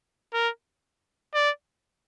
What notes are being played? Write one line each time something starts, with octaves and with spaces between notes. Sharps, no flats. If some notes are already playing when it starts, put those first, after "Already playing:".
A#4
D5